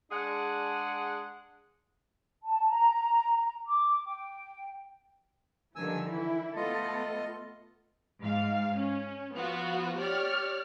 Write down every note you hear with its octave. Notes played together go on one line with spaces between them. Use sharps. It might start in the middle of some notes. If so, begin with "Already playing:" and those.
G#3 D4 G#4 F#5
A5
A#5
D6
G5
G2 D3 D#3 F3 G#5 E6
E3 E4
A3 B3 F4 A4 D#5
G#2 F5
C#4
F3 B3 F4 F#4
G4 C#5 D5 F6